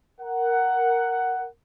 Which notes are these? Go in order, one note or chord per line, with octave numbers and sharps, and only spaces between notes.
A#4 F#5